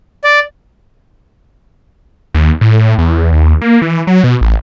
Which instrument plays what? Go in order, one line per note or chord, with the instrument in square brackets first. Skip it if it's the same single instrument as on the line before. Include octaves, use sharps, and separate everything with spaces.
[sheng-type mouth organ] D5
[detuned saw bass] D#2
A2
E2
D#2
A#3
E3
F#3
B2
A1